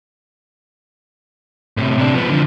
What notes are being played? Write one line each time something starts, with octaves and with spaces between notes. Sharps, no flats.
A2 C3
C3 D4
F3 B3
D3 F3